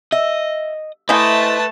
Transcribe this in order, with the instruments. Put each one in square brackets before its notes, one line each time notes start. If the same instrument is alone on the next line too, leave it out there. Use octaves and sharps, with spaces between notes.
[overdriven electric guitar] D#5 [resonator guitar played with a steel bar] E5
[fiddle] A3 A5 [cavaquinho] E4 C5 D#5 [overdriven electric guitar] B4 [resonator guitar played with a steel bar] G#5